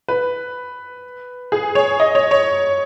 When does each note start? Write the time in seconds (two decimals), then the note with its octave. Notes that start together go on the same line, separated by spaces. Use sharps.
0.09 B4
1.52 G#4
1.75 C#5
2.00 D#5
2.15 C#5
2.31 C#5